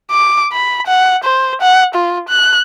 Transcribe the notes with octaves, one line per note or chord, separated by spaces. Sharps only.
D6
B5
F#5
C5
F#5
F4
F#6